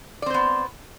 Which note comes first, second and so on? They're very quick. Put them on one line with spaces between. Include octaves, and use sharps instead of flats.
D5 C4 C5 B3